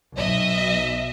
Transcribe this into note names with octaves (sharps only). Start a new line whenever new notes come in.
B1 D#5 E5